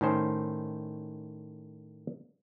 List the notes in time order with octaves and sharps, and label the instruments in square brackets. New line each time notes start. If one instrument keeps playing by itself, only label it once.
[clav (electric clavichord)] A2 D#3 C#4 C5